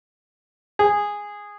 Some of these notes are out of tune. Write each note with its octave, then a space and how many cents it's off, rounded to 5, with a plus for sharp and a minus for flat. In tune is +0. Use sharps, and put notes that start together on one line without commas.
G#4 -10